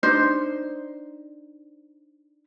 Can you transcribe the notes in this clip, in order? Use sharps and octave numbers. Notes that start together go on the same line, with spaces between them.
D4 D#4 C5